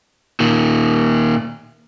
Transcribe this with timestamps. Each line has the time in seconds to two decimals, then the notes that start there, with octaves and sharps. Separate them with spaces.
0.40 A#2 D#3